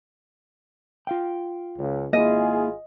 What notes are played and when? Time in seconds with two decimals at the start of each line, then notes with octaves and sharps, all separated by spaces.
1.07 F4 F5 G5
1.78 C#2
2.13 G#1 A#3 E4 F4 G#4 D#5